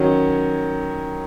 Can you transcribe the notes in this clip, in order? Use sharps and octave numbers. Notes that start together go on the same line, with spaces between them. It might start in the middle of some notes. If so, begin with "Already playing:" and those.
Already playing: D#3 F#3 C#4